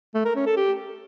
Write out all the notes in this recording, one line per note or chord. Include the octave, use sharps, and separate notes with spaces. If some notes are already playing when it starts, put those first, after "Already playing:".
A3
A#4
C#4
A4
G4